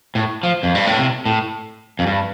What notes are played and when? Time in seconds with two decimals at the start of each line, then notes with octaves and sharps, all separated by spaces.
0.15 A2
0.43 F3
0.63 F2
0.75 G2
0.86 A2
0.98 C3
1.26 A2
1.99 F2
2.07 G2